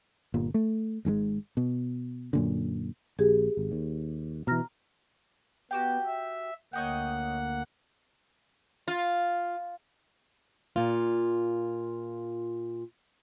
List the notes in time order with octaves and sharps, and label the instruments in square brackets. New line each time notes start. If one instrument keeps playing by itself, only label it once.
[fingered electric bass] G1 A#2
A3
G#1 G#2 C#3 G#3
B2
F#2 A#2 D3
[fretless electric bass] A#1 [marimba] G4 G#4
[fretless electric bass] G#1
D#2
[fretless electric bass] B2 E3 [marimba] A#5 F6 A#6
[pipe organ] B3 [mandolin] F#4 G4 G5
[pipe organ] E5
[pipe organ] D2 A#3 F#5 [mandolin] C#5 D#5 G5
[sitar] F4
[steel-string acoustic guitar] A#2 F4